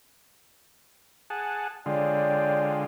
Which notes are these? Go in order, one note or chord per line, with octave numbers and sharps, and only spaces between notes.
G#4 F#5 A5
D3 G#3 F4 C#5 D5 G5